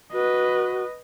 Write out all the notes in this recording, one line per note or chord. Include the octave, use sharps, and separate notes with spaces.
F#4 B4 D#5